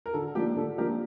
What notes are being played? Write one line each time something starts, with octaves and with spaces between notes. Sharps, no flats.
A#4
D3 A4
F3 A#3 D4 G4
D3 A4
F3 A#3 D4 G4 A#4